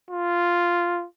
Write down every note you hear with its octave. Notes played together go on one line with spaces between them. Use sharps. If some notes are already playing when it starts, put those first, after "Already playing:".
F4